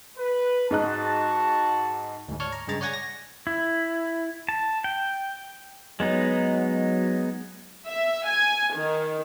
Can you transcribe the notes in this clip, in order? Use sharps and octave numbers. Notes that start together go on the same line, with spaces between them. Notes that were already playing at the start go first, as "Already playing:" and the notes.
B4
G#2 D#4 F#4 A5 F#6
D2 G#2
C#5 D5 A5 C#6 F6
A#5
G2 C#3 G#3 A#5 A6
C#5 D5 F#5 G#5 G#6 A#6
A#6
E4
A5
G5
F#3 G#3 B3 D#4
E5
G#5
D#3